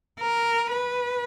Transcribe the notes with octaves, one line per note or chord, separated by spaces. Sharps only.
A#4
B4